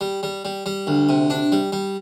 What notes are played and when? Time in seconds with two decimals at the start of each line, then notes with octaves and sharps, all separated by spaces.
0.01 G3
0.23 G3
0.45 G3
0.66 G3
0.87 D2
1.09 C3
1.30 D4
1.52 G3
1.72 G3